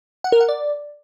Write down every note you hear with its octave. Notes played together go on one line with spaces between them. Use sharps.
F#5
A#4
F#5
D5